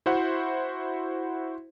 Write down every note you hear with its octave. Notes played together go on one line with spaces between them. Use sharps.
E4 F#4 C5 E5 F#5